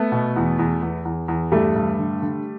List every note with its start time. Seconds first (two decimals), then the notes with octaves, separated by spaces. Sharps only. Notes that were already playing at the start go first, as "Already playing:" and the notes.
Already playing: A3 B3
0.12 B2
0.36 E2
0.59 E2
0.82 E2
1.05 E2
1.28 E2
1.52 G2 G3 A3
1.76 G2
1.99 D3
2.22 D3